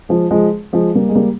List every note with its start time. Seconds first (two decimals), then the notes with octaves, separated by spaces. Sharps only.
0.09 F3 G#3
0.31 F3 G#3
0.73 F3 G#3
0.95 G3 A#3
1.09 G#3
1.16 G3 A#3